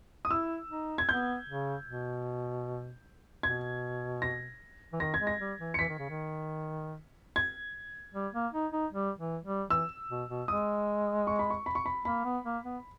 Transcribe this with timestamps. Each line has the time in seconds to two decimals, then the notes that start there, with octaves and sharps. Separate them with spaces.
0.25 D#6
0.31 E4 E6
0.70 D#4
0.98 G#6
1.08 B3 G6
1.48 C#3
1.87 B2
3.43 B2 G#6
4.22 A#6
4.93 E3
5.00 D#3 A#6
5.14 G#6
5.20 G#3
5.27 A#6
5.40 G3
5.59 E3
5.74 C#7
5.79 E3 B6
5.89 D#3
5.99 C#3
6.09 D#3
7.36 G#6
8.14 G3
8.33 A#3
8.53 D#4
8.72 D#4
8.92 G3
9.18 E3
9.45 G3
9.70 E3 E6
10.10 B2
10.29 B2
10.48 G#3 D#6
11.27 C#6
11.39 B5
11.50 C#6
11.66 B5
11.75 C#6
11.86 B5
12.05 A#3 B5
12.24 B3
12.45 A#3
12.64 B3